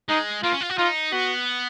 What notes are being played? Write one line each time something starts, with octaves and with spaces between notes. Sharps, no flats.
G#3 D#4
A#3 F4
C#4
F4
F#4
D#4 F4
B3 F#4